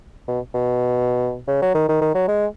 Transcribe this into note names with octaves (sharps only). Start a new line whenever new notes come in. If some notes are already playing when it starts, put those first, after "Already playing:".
B2
B2
C#3
F#3
D#3
D#3
D#3
F#3
G#3